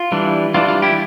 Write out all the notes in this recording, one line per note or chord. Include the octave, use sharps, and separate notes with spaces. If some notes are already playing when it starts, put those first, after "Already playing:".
Already playing: F4
E3 G3 D4
E3 G3 D4 F4
F4
E4 G4